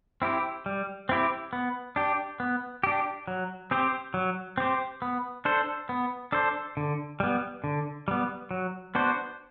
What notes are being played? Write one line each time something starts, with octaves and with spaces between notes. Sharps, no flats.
C4 E4 G4
G3
C4 E4 G4
B3
D4 G4
B3
D4 G4
F#3
C4 G4 C5
F#3
C4 G4 C5
B3
D4 A4 C5
B3
D4 A4 C5
D3
G3 B3
D3
G3 B3
F#3
B3 D4 F#4 C5